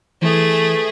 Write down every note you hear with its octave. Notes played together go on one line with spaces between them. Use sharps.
E3 A3 G#4